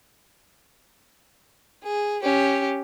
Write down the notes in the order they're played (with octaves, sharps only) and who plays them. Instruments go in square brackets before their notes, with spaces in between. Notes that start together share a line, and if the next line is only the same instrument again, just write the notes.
[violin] G#4
C#4 G4